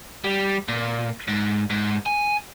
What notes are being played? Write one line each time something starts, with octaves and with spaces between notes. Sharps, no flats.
G3
A#2
G#2
G#2
G#5